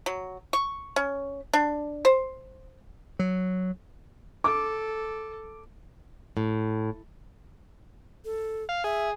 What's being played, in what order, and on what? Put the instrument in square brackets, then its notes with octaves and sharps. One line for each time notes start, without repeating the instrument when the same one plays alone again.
[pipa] F#3
C#6
C#4
D4
C5
[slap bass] F#3
[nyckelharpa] A4 [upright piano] D6
[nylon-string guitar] A2
[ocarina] A4
[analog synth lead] F5
[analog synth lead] G#4 [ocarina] E5